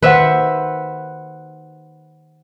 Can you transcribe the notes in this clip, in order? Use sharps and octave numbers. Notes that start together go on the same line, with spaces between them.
D#3 B4 C5 E5 F#5